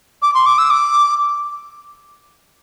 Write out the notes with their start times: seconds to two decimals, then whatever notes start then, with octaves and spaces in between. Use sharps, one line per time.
0.22 D6
0.34 C6
0.46 D6
0.58 E6
0.70 D6